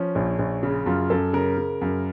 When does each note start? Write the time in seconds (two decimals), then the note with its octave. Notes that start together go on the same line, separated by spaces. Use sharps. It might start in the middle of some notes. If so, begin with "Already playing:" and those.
Already playing: F3 C#4
0.15 A#1
0.39 A#1
0.63 C#3
0.86 F#2 F4
1.10 F#2 A4
1.33 C#3 A#4
1.57 C#3
1.81 F#2